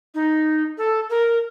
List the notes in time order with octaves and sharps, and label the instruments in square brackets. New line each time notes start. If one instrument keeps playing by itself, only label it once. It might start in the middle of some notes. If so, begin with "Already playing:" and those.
[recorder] D#4
A4
A#4